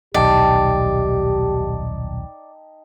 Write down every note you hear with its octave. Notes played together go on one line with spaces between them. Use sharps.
D#1 B1 D#4 G4 D5 G5 A5